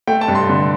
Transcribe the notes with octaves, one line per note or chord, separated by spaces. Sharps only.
A3 G5
A5
G2
C6
D3